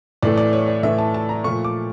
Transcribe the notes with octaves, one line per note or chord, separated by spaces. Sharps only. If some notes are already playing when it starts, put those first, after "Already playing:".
A2 E3 A3 D5
D5
C#5
D5
A2 E3 A3 E5
A5
A5
A#5
A#2 F3 A3 C#6
D6